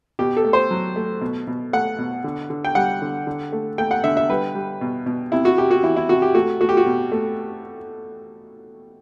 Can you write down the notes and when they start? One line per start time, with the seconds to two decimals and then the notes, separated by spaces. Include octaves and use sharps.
0.19 B2 G4
0.37 A4
0.44 A3
0.53 C5
0.71 F#3
0.96 A3
1.21 B2
1.47 B2
1.73 A3 F#5
1.98 B2
2.24 D3
2.50 D3
2.65 G5
2.75 G3 F#5
3.02 D3
3.27 D3
3.52 A3
3.78 A3 G5
3.91 F#5
4.04 D3 E5
4.17 E5
4.30 G3 B4
4.55 G3
4.81 B2
5.06 B2
5.32 C3 E4
5.45 F#4
5.58 C3 G4
5.71 F#4
5.83 E3 E4
5.96 E4
6.09 C3 F#4
6.22 G4
6.34 A3 F#4
6.61 A3 F#4
6.69 G4
6.77 F#4
6.86 B2
7.12 A3